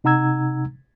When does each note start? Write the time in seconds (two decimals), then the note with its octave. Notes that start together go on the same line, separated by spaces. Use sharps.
0.04 C3 D#4 F#5 A#5 E6 G#6